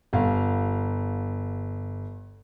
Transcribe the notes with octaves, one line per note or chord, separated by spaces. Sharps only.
G1 F5